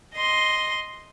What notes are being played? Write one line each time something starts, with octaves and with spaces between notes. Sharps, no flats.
D#5 C6